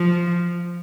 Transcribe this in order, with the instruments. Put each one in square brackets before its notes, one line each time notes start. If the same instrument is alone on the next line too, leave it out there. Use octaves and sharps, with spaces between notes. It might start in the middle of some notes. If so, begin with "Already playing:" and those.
Already playing: [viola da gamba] F3